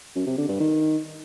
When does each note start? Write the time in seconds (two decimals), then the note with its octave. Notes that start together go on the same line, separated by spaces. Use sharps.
0.15 F#2
0.26 C3
0.37 D3
0.49 G2
0.60 D#3